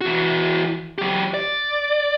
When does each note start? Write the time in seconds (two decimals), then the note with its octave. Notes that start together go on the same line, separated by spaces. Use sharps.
0.01 E3 F#4
0.98 F#3 G4
1.34 D5